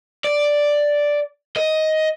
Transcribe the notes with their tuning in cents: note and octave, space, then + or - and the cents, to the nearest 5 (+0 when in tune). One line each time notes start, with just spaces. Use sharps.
D5 +0
D#5 +10